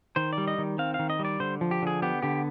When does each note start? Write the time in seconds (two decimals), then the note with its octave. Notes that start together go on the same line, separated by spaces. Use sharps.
0.16 D#3 C5
0.33 D5
0.38 G3
0.48 D#5
0.58 D#3
0.79 C4 F5
0.94 F5
0.99 D#3
1.10 D#5
1.19 G3
1.25 D5
1.40 D3 C5
1.61 F3
1.71 G4
1.82 D3 G#4
2.02 B3 G4
2.22 D3 G4